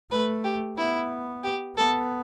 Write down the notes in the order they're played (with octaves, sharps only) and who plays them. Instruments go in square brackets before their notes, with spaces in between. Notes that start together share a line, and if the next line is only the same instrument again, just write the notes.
[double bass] A3 [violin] B4
[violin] G4
[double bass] B3 [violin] E4
[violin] G4
[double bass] B3 [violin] A4